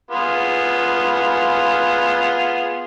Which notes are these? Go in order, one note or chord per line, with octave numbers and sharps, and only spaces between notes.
B3 F4 G#4